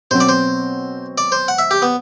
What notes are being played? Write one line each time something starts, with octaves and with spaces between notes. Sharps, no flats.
B2 F#3 C4 C5
D5
C5
D5
C5
F#5
E5
G4
B3